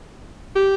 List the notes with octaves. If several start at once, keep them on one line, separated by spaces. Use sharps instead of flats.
G4